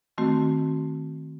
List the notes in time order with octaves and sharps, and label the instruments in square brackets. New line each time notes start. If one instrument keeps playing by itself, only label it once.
[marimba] D#3 A3 C4 F#4